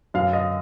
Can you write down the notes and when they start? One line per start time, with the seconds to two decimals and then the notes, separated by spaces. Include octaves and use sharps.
0.14 F#2 F5
0.33 D#5